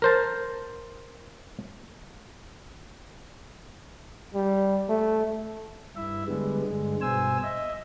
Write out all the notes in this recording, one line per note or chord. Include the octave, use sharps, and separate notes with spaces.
A#4 C5 A5
G3
A3
G2 E4 E5
D3 G3 G#3 B3
G2 D3 G#3
G2 B2 C5 G#5 E6
D#5 E5